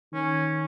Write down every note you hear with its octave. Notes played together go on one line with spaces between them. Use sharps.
D#3 C#4